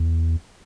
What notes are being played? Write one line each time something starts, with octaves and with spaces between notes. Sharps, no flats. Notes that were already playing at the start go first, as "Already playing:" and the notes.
Already playing: E2